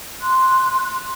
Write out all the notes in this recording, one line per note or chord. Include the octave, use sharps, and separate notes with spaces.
C6 F#6